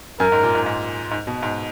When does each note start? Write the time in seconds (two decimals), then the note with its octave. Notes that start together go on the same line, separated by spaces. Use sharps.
0.20 F#2 A#4
0.32 G#2
0.43 A#2
0.55 G#2
0.66 G#2
1.11 G#2
1.27 B2
1.43 G#2